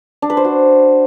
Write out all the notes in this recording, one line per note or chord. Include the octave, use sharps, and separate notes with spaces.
D4
B4
C5
F#4